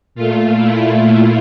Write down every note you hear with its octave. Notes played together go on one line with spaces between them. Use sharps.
A#2 A3 F4
E4
E4